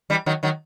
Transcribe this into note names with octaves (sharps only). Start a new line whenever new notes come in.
E3 G3
D#3 F#3
D#3 F#3